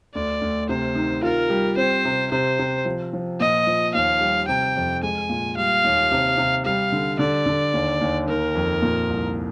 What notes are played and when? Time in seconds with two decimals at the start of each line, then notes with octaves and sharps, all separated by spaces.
0.15 D2 D5
0.41 D2
0.69 C3 C5
0.95 D#3
1.23 F4 A#4
1.50 G3
1.77 C4 C5
2.05 C3
2.31 C3 C5
2.59 C3
2.85 F3
3.13 F3
3.40 A#2 D#5
3.67 F3
3.94 D#2 F5
4.21 G3
4.48 C3 G5
4.76 F2
5.03 G#3 G#5
5.29 A#2
5.57 G3 F5
5.84 D#2
6.12 C3
6.38 C3
6.65 G3 F5
6.92 D3
7.19 D3 D5
7.46 D3
7.74 D#2
8.01 D#2
8.28 D#3 A#4
8.55 F2
8.82 A#2
9.09 C2